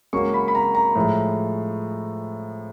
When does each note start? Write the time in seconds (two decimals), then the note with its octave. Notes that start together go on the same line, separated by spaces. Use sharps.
0.13 C#2 C#3 F#3 A#3 C#6
0.34 B5
0.48 B5
0.55 A#5
0.75 A#5
0.95 A2 F3 G#3